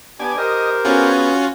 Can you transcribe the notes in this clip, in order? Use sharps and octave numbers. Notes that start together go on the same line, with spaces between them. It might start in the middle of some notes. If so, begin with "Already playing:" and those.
B3 D4 G4 D5 G#5
G4 A#4 C5 D#5
B3 C#4 F4 F#4 G#4